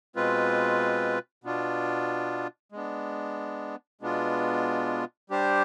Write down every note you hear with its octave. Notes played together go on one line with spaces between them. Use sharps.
B2 G#3 C4 F4 B4
B2 B3 D4 F4
G#3 B3 D4
B2 G#3 B3 D4 F4
G3 D4 G4 C5